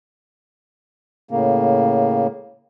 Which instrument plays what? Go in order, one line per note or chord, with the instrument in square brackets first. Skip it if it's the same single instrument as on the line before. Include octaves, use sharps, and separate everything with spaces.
[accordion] A2 C#3 A#3